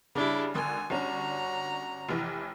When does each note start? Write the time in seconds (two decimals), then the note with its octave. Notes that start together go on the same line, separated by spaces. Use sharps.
0.15 C#3 G3 D4 E4
0.55 G#1 D3 A#4 G#5
0.90 G1 C#4 D4 F#4 A#5
2.09 F1 E3